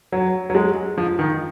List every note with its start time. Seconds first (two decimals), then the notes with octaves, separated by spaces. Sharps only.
0.12 F#3
0.50 F#3
0.55 G#3
0.98 F3
1.19 D#3